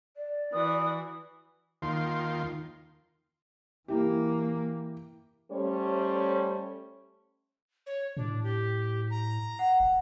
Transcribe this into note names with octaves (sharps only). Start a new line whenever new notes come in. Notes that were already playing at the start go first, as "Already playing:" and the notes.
D5
E3 F#4 D#6
D#2 D#3 F4 C6
E3 A#3 E4 G4
G3 A3 C#4 C5 C#5
C#5
A2 D4
G4
A#5
F#5
D#1